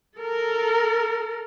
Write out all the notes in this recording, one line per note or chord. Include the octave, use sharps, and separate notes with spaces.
A4 A#4